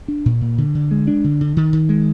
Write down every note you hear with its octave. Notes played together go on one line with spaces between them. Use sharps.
D4
A#2
A#2
D3
D3
G#3
D4
D3
D3
D#3
D#3
G#3